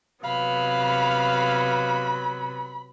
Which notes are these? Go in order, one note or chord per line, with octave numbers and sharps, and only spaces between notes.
C3 F#3 B3 F5 B5